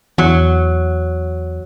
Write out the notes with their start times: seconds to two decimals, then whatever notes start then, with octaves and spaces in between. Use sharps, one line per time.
0.18 E2 F#3